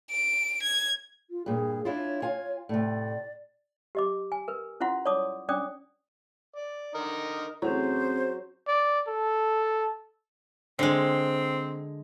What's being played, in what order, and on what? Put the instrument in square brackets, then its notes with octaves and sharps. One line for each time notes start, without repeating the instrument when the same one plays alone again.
[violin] D7
G#6
[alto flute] F4
[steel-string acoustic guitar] G2 A#2 [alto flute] G#4
[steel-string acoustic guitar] D4 E4 F4 [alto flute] C#5
[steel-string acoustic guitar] F4 G#5
[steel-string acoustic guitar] A2 C3 [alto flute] D5
[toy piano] G4 D#5 D6
G#5
A#4 B4
C#4 E4 F4 F#5 C6
C#5 D5 A5 D6 D#6
C#4 D4 D5 G5 D6 D#6
[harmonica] D5
D3 D#4 A#4
[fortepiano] A2 E3 A3 [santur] F#3 [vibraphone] C4 C#4 G#4 [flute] C5
[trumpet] D5
A4
[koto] D3 G#3 [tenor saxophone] C4